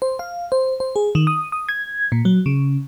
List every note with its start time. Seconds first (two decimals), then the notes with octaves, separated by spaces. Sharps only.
0.02 C5
0.19 F5
0.52 C5
0.80 C5
0.96 G#4
1.15 D#3
1.27 D#6
1.52 D#6
1.69 G#6
2.12 A#2
2.25 F#3
2.46 C#3